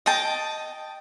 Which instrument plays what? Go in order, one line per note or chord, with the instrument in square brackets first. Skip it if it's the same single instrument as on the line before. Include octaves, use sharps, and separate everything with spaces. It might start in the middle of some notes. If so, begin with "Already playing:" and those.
[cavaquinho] D#5 G5 A5